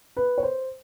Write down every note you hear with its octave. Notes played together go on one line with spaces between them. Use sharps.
B4
C#5
C5